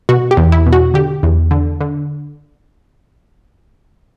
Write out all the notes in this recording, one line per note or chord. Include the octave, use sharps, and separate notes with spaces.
B2 F#4
G4
E2
E4
B2
F#4
D3 G4
E2
D3
D3